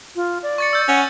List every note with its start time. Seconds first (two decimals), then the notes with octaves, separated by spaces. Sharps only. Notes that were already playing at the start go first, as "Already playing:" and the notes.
0.16 F4
0.43 D5
0.58 C#6 A6 C#7
0.73 E6 G6
0.88 C#4 F#5